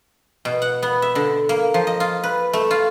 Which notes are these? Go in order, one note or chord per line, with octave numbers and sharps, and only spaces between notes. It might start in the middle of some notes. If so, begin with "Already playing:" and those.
B2
F#5
B3
E5
D3
A#3
F3
D#5
F4
B4
A3
F4